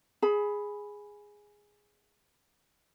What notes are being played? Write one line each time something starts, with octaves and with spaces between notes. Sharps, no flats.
G#4 B5